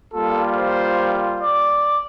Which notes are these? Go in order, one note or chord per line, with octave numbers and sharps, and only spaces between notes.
G3 A#3 F4 A4
C5
D5